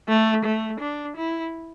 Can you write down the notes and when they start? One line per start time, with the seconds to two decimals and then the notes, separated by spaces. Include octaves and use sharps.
0.09 A3
0.45 A3
0.80 D4
1.17 E4